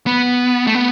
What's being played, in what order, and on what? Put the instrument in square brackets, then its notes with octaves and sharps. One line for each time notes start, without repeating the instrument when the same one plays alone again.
[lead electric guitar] B3
A3
B3